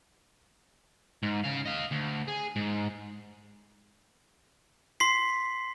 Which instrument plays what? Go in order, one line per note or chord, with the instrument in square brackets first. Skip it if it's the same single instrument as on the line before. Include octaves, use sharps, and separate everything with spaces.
[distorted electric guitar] G#2
C#3 F5
D#5 F5
D2
G#4
G#2
[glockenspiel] C6 B6 C7